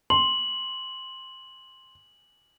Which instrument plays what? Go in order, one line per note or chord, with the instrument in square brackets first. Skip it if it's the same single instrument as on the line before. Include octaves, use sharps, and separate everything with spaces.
[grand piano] C6 [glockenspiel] F#7